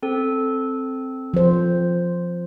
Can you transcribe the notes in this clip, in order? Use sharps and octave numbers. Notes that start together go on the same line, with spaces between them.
C4 A4
F3 C5